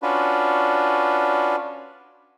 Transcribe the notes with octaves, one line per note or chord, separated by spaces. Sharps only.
C#4 D4 F4 F#4 B4